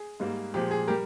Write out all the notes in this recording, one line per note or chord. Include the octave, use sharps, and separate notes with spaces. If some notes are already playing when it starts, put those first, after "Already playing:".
Already playing: G#4
G#2 G3 A#3
A#2 F3 G#3 G4
G#4
G3 G4 A#4